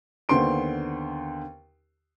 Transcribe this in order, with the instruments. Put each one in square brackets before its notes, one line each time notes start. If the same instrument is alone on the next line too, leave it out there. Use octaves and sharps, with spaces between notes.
[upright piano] D#2 D3 B3 C5 C6 D7